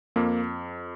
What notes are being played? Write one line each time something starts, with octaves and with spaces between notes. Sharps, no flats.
F2 A#3